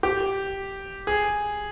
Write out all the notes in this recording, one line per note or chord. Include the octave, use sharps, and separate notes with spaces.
G4
G#4